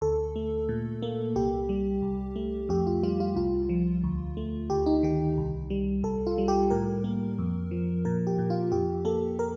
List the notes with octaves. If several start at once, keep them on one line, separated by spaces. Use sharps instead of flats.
D2 A4
A3
A#2
A#3
C2 G4
G3
C2
A3
F2 G4
F4
G3 F4
F4
C2 F4
F3
D2
A3
D2 G4
D#4
D#3 G4
C2
G3
C2 A4
F4
G3
G4
A2 A#4
A#3
F2
F3
A#2 A#4
G4
A#2
F4
F2 G4
A#3 A4
A#4